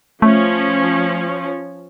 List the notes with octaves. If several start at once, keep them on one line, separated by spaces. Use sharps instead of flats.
F3 A3 C#4